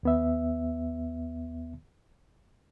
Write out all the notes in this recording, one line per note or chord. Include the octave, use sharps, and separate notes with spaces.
D#2 B3 E5